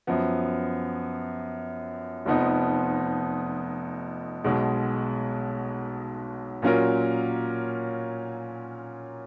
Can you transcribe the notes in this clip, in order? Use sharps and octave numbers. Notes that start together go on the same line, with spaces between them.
F#2 F3 B3
F1 F2 F3 B3 D#4
B1 B2 G#3
A#2 F#3 C#4 F4 A#4